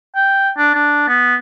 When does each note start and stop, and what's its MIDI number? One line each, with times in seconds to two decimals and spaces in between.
0.16 0.50 79
0.58 0.75 62
0.75 1.07 62
1.08 1.35 59